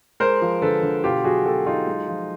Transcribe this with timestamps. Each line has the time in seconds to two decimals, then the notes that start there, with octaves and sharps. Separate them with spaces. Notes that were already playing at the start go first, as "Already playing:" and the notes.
0.20 G#3 A#4 C5
0.42 F3
0.62 D3 A4 B4
0.83 D3
1.04 B2 F4 G4
1.24 F#3 F#4 G#4
1.45 B2 G4 A4
1.66 F#3 D#4 F4
1.87 G#3
2.08 F3